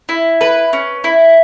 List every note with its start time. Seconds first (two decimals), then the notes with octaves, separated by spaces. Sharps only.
0.09 E4
0.41 B4
0.73 C#4
1.04 E4